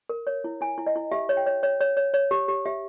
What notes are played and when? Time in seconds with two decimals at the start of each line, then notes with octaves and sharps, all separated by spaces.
0.09 A#4
0.27 C#5
0.44 E4
0.61 E4 G#5
0.78 E4
0.87 D#5
0.96 E4
1.12 G4 E5
1.29 C#5
1.37 G5
1.46 C#5
1.63 C#5
1.81 C#5
1.97 C#5
2.14 C#5
2.31 G4
2.48 G4
2.66 G4 E5